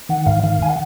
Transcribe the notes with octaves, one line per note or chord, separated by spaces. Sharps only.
D#3 F#5
G#2 F5
D#3 F5
G#5
F#5